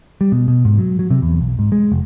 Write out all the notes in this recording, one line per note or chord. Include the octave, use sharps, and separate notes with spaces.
G3
B2
B2
G#2
F#3
F#3
C3
E2
B1
G#2
G#3
F1